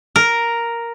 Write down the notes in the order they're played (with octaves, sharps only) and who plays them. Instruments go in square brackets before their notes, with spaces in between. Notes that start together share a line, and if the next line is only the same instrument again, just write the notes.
[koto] A#4